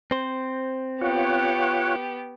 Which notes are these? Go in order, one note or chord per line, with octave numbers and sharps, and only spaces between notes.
C4 C5
B3 F4 G4 C#5 F#5